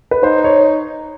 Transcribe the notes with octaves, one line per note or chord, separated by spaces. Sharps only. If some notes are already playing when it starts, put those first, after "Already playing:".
B4
D#4 C5
C#5